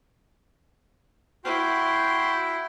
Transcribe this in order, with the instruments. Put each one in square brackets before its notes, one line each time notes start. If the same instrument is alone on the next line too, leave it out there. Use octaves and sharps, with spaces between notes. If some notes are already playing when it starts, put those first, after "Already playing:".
[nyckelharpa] E4 [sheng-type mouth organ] F#4 G5 C6